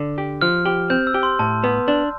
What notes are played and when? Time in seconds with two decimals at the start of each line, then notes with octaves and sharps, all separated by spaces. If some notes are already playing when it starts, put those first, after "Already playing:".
Already playing: D3
0.18 G4
0.41 F3 F6
0.65 G4
0.90 C4 G6
1.07 E6
1.14 G4
1.23 C6
1.39 A2 A5
1.64 B3
1.88 D4